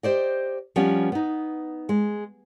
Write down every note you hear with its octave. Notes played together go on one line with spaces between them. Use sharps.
G4 C5 D5 D#5
F3 G3 B3 C#4
B3 D#4
G#3